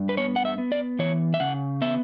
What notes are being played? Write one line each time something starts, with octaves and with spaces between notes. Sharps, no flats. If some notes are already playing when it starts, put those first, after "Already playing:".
Already playing: G2
B4
B3 C#5
F#5
E5
B3
D5
E3 C#5
E5
C#3 F#5
B3 E5